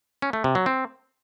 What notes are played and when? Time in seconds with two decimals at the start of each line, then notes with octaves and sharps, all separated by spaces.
0.22 C#4
0.33 A3
0.44 C3
0.55 F#3
0.66 C4